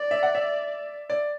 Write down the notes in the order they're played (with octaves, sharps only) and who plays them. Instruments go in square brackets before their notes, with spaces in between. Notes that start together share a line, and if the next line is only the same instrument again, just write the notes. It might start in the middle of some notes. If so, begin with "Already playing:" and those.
Already playing: [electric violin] D5
[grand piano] E5
F#5
E5
D5